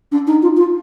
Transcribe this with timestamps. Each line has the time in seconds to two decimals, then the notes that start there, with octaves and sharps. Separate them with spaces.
0.12 D4
0.27 D#4
0.42 F4
0.57 F4